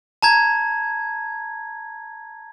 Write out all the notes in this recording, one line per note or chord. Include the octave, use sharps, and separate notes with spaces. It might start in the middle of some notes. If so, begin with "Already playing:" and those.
A5 A#5 G#6